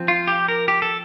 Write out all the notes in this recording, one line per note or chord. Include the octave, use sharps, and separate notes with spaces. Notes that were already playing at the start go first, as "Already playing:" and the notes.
Already playing: F3 C4
F4
G4
A#4
G4
A4